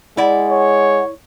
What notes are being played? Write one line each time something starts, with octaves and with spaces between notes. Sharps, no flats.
G#3 E4 D5 F#5
C#5